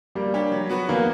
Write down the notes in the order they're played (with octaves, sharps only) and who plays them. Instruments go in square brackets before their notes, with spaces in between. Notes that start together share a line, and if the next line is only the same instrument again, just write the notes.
[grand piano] G3 [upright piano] A#3
[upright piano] D4 G4 C#5
F#3
B3 F#4 B4
[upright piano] E3 [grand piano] A#3